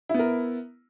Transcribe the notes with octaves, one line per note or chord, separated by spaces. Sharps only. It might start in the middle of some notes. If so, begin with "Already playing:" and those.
B3 E4 A#4